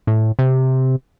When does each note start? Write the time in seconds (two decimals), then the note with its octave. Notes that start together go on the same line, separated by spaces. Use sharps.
0.07 A2
0.39 C3